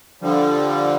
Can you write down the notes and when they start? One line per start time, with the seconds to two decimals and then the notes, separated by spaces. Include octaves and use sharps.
0.22 D3 F3 G3